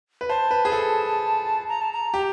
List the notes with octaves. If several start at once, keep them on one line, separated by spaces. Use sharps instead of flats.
B4
C5 A5
B4
G#4
A4
A#5
A5
A#5
G4